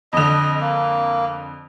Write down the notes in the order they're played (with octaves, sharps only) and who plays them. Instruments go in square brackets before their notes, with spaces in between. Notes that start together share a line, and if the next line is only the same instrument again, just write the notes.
[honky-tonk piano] F2 D3 [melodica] D#5
[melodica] A#3